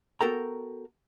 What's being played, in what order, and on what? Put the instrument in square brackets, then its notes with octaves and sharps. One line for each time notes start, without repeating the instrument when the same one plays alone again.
[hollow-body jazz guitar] B3 F#4 A4 A#4 G5 A#5